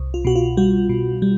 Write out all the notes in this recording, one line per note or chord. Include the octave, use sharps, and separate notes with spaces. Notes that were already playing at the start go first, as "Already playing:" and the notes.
Already playing: C2
F4
B2 F#4
F4
G3 F#4
B2
G3